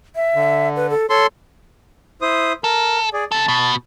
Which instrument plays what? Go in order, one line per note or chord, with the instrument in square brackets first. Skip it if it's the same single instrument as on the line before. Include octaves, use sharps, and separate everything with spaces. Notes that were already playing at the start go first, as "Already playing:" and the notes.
[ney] E5
[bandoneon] D3
[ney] B4
A4
[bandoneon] A4 C6 [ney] C#5
[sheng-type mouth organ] E4 C5 D#6
[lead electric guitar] A4 [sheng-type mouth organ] A#4
[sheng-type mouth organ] G#4 D5
[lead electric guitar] C3 A4 [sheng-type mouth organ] A5
[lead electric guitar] B2